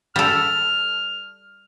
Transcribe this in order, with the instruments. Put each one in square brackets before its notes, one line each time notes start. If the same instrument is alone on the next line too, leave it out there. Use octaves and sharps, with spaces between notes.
[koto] G3 A4 [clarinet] F6